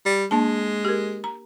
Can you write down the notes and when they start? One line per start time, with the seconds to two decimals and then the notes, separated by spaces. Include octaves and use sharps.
0.06 G3
0.31 G#3 A#3 D4 A5
0.85 G4 A#4
1.24 A#5